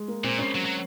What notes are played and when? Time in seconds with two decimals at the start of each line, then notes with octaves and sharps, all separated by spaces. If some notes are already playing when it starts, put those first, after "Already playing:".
Already playing: G#3
0.08 A#3
0.24 A#2 C4
0.39 C#4
0.55 F#3
0.65 F#3